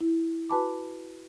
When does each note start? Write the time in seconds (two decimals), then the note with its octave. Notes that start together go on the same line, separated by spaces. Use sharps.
0.01 E4
0.50 F#4 B4 G#5 A5 B5 D6